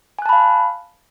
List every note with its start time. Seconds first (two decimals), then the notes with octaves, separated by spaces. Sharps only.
0.19 G#5
0.22 F#6
0.26 A5
0.29 B5
0.33 F5